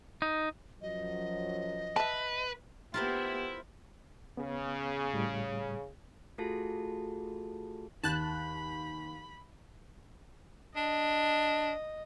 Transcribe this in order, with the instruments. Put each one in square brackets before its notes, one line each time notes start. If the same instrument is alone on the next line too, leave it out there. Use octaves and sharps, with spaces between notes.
[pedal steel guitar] D#4
[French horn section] F#2 F3 F#3 [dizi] D#5
[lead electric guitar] B4 [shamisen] E5 A5
[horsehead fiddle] B3 G4 [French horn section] E4 [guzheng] F4 A#4 C5
[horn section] C#3 [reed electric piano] B3
[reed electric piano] A2 G3
[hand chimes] A3 F4 F#4 G#4 A4 A5
[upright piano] D#2 G6 [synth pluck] A5 F#6 [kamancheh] B5
[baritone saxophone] D4 [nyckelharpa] D#5